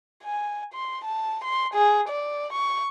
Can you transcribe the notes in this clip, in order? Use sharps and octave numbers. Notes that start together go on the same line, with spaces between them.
G#5
C6
A5
C6
G#4
D5
C#6